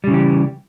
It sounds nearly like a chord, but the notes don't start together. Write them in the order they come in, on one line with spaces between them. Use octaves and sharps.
G3 C#3 E3 G4